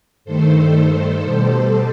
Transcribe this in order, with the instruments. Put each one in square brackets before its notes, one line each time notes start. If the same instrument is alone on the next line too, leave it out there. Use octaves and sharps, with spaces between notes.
[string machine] G2 D#3 A3 A4 C5
B2 G3